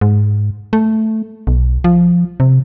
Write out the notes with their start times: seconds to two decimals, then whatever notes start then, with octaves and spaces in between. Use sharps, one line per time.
0.01 G#2
0.73 A3
1.47 B1
1.84 F3
2.40 C3